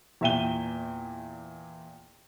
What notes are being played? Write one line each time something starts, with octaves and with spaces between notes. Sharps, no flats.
E2 A#2 E5 G5 D#7 G7